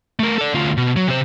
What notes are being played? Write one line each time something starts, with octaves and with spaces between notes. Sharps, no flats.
A3 A#4
A4 D5
D2 F4
B2
F#3
C3 C5